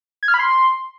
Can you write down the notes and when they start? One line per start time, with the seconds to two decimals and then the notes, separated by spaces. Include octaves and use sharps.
0.23 G#6
0.28 F6
0.34 B5
0.40 C6